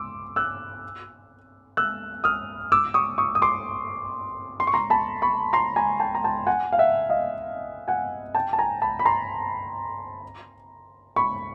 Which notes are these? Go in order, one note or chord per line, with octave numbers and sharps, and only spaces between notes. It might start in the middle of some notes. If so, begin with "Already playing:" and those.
Already playing: C6 D6 E6
E6 F#6
E6 F#6
D#6 F6
D6 E6
C#6 D#6
C#6 D#6
D#6
C6 D6
C6
C#6
A#5 C6
A5 B5
B5 C#6
A#5 C6
G#5 A#5
G5 A5
A#5
G5 A5
F#5 G#5
F5
E5 F#5
D#5 F5
F#5 G#5
G5 A5
A5
G#5 A#5
A5 B5
B5
A#5 C6
B5 C#6